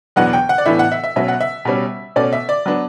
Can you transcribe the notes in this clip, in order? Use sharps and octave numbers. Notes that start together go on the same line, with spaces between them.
E2 B2 F#3 B3 D4 F#5
G5
F#5
D5
A2 E3 B3 D4 E5
F#5
E5
E5
B2 F#3 C#4 E5
F#5
E5
B2 G3 C#4
B2 A3 C#4 D5
E5
D5
F#3 B3 D4